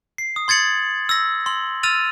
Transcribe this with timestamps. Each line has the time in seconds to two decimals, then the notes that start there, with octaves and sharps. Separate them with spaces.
0.18 C7
0.36 D#6
0.48 C6 G#6 A6 C#7 F#7
1.09 E6 A#6
1.46 C6 F#7
1.83 E6 F6 A6 D#7 F7